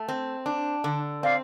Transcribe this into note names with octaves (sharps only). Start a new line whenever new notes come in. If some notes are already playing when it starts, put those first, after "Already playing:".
Already playing: A3
C4
D4
D3
C4 D5 F5